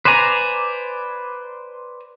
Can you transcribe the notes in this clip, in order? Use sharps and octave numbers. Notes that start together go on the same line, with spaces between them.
B4 C5 D5 G#5 A#5